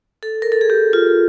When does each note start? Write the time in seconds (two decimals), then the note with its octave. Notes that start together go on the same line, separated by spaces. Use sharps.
0.23 A4
0.42 A#4
0.52 A4
0.61 G#4
0.70 G4
0.93 F4